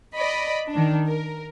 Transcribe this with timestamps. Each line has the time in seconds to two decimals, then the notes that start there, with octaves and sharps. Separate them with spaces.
0.15 D5 D#5 B5
0.70 D#3 D4
1.06 A#4